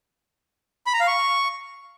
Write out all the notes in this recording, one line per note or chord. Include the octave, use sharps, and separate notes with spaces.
B5
A#5
F5
C#6